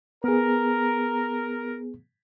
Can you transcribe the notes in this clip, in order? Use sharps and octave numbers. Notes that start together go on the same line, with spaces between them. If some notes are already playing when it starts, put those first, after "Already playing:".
B3 G#4 A#4